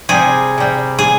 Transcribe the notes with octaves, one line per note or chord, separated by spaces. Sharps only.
C3 G3 G#4
C3 G3
G#4